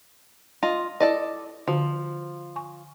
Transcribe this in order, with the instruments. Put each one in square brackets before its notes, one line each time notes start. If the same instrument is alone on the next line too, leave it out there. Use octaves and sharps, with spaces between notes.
[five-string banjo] F4 D#5
[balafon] E4 [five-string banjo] A4 D5 D#5
[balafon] D3 F#4 [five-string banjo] F3
[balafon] G#5 C#6